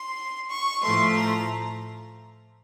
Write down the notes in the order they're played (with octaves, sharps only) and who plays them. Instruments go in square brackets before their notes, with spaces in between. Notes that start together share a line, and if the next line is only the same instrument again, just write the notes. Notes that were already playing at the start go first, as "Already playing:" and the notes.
Already playing: [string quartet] C6
C#6
A2 F3 A3 C6
A#5